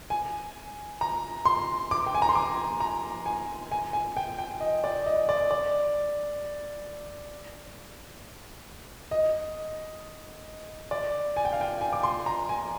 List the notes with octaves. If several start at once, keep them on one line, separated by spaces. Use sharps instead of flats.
G#5
A#5
C6
D6
G5
G#5
A#5
C6
D6
A#5
G#5
G#5
G#5
G5
G5
D#5
D5
D#5
D5
D5
D#5
D5
G#5
G5
F5
G5
G#5
D6
C6
A#5
G#5